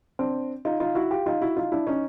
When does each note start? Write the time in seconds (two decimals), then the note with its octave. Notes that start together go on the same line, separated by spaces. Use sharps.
0.19 C4 D4
0.65 D#4 F4
0.80 D#4 F4
0.95 E4 F#4
1.11 F4 G4
1.26 D#4 F4
1.41 E4 F#4
1.57 D#4 F4
1.72 D4 E4
1.87 C#4 D#4